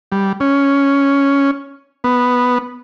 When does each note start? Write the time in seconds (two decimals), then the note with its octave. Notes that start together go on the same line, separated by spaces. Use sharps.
0.12 G3
0.40 C#4
2.04 B3